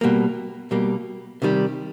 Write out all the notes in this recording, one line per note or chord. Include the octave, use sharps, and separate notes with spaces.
B2 G3 A#3
B2 G3 A#3
C3 D#3 G3